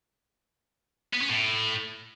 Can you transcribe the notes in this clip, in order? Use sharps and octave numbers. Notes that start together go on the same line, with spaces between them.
B3
C#4
A2